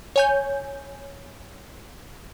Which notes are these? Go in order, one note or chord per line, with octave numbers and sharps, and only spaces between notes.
C#5 G#5 G6